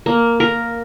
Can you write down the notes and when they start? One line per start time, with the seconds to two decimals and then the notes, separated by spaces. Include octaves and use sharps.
0.06 A#3
0.40 A#4